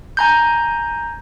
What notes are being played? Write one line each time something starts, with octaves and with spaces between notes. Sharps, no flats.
G#5 A#5 G6